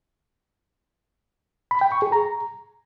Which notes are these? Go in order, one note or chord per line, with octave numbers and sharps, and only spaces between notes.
B5
G5
C#6
G#4
A#5